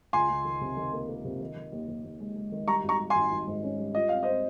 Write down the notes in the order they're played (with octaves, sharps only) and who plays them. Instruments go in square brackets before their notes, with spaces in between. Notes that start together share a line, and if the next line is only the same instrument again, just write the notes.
[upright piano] C#2 [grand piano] G#5 C6
[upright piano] C#2
D#3
C3
D#3
A#3
A#3
C3
D#3
D#3
D#2
D#2
D#2
G#3
G#3
D#3
[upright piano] G3 [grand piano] A#5 C#6
[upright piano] G#1
[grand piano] A#5 C#6
[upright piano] G3
[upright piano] G#1 [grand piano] G#5 C6
[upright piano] G#1
G#2
C#4
G3
[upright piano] F4 [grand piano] D#5
[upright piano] C4 [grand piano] F5
[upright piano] C4 [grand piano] C5 D#5